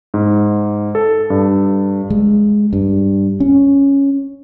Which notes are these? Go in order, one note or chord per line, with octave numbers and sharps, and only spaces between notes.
G#2
A4
G2
G#3
G2
C#4